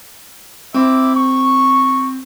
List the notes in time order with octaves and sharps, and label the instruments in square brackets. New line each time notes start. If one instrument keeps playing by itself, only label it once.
[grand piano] C4 [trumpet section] E4 E5 D6
[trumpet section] C#6